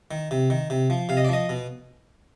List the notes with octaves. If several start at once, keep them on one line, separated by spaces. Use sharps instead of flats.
D#3
C3
D#3
C3
F3
C3 F5
D#5
D5
F3 D#5
B2